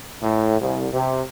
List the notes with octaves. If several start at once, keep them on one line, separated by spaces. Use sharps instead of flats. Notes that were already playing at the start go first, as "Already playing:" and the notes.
A2
C2
C3